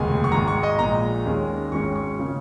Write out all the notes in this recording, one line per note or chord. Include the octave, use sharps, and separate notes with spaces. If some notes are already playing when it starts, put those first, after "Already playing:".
Already playing: F1 D#2 C#3 G#3 G#5
C#6
G#1 G#2 G#3 A#5
C#6
D#5
A#1 A#2 G#3 A#5
D#2 D#3 G#3 C#4
G#1 G#2 G#3 C#4 C#6
C#6
C#3 A#3 C#4